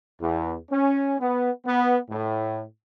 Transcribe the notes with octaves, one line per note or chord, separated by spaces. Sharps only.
E2
C#4
B3
B3
A2